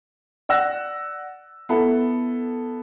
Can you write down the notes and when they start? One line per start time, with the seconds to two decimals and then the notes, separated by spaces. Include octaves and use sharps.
0.49 D5 F#5 E6 F#6 A#6
1.69 B3 E4 A4